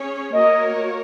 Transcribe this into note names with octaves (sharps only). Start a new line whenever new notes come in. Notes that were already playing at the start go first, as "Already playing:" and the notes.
Already playing: C#4 G#4 C#5
A#3 F#4 A#4 C#5 D#5